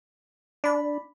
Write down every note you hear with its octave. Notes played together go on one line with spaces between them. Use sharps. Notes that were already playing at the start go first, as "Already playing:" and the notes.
D4 D5 B5